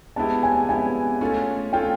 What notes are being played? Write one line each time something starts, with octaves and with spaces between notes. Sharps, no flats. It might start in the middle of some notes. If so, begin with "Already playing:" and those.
G#3 B3 E4 G4 A5
G#5
G#3 B3 E4 G4 G#5
A3 C#4 F4 A4
A3 C#4 F4 A4 G5